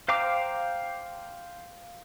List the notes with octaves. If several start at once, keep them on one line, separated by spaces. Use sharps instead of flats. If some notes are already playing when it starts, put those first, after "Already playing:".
C5 F5 G5 A#5 D6